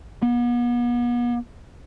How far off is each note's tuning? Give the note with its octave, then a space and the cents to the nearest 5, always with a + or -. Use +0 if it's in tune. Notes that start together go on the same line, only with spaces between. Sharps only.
B3 -40